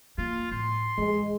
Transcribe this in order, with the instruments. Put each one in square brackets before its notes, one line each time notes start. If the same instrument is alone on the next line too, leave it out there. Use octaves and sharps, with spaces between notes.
[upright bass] A#3 [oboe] F4
[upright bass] A2 [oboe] C6
[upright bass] E3 [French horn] G#3